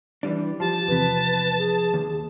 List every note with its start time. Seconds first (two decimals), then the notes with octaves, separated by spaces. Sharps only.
0.23 E3 G3 D4
0.60 F3 G4 A5
0.88 E2 C3 B4
1.59 G#4
1.94 D#2